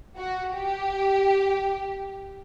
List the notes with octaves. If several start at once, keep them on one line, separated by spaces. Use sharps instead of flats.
F#4
G4